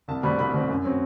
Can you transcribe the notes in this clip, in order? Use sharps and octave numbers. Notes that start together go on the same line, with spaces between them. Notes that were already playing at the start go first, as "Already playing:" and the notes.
C2 A5
B2 G3 C4 B5
C2 B5
B2 G3 C4
F#2
F#3 C4